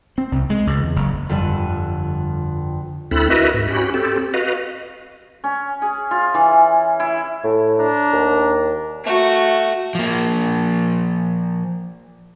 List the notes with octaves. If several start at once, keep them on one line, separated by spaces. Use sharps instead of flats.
C4
C2
G#3
C#2
E2
F#1
G1 F2 D3 G3 F#6 D#7
D2 C4 E4 A4 B5 F#6
E4 F#4 A#4 B4 D#5 E5
G#2
C#4 F#4 G4 B5
C4 G4 A4
F#4 B4 D#5 F5
C#4
G#4
F4
E3
E4
A2
D4 A#5
D#2
A3 F#4
F3 A#3